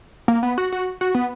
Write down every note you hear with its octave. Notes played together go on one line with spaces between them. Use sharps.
A#3
B3
F#4
F#4
F#4
B3